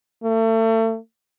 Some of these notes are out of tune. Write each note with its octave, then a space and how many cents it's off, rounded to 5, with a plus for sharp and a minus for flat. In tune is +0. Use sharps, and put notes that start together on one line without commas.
A3 +35